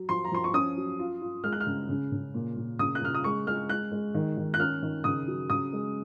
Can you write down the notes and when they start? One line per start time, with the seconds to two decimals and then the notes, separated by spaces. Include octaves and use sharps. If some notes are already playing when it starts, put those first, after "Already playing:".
Already playing: F#3
0.09 F3 C6
0.25 A#5
0.32 F3 C6
0.44 C#6
0.54 C#4 D#6
0.77 F#3
0.99 F4
1.22 F4
1.44 G#3 F6
1.52 F#6
1.60 F6
1.67 C#3
1.89 C#3
2.12 C#3
2.34 A#2
2.56 A#2
2.79 C#3 D#6
2.95 F#6
3.02 C#3 F6
3.14 D#6
3.24 G#3 C#6
3.47 G#3 F6
3.69 G#3 F#6
3.92 G#3
4.14 D#3
4.37 D#3
4.54 F#6
4.59 C#4 F6
4.82 D#3
5.04 C#3 D#6
5.27 F#3
5.50 C#3 D#6
5.73 G#3